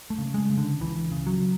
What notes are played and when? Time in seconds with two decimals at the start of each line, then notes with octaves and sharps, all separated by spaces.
0.10 A3
0.18 C#3
0.34 G#3
0.50 C#3
0.58 D3
0.80 C#2 E3
1.12 C#3
1.27 F#3